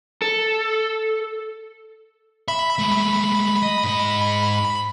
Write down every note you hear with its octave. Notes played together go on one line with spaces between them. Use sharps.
A4
E5 B5
G#3 A3
D#5
G#2 D#5